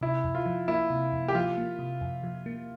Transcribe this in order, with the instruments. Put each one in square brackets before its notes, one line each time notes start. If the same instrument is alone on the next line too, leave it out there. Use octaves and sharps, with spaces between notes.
[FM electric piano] C3 [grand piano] E4
[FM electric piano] F2
[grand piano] F4
[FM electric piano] F3
[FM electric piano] A#3 [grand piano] E4
[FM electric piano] C3
F2
[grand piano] G4
[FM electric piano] F3 [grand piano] F4
[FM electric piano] A#3
C3
F2
F3
A#3